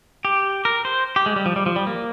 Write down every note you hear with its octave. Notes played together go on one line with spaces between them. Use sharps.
G4
A#4
C5
G4
G#3
G3
F3
G3
F3
G3
A#3